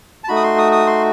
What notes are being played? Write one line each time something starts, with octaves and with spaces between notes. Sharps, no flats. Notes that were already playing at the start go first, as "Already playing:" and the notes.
A5
A3 D#4 F#4 B5
D#6
C6
D#6
D#6
C6